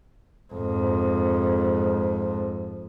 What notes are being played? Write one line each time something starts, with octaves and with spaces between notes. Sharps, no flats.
F2 G#2